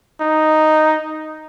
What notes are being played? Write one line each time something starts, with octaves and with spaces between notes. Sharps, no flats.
D#4